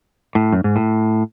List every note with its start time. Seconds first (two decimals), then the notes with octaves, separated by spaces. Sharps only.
0.35 A2
0.53 F#2
0.64 G#2
0.76 A2